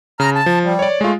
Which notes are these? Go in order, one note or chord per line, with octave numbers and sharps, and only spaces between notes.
C#3 A#5 F6
A5
F3
G3
C#5 D5
G#3 A3 F4